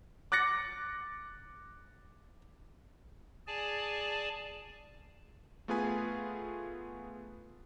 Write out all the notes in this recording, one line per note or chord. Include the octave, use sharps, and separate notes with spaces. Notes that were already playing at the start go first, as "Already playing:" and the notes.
D6 F#6 A6 A#6 C#7
G#4 D5 G#5 A5
A3 B3 F4 G#4 B4 G#5